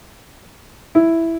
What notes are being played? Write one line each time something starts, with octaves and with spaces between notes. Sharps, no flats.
E4